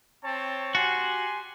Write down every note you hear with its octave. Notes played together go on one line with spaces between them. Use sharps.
C4 C#5 A5
F#4 G4 G#5 C6